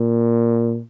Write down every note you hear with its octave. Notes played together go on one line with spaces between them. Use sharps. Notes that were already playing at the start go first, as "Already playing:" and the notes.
Already playing: A#2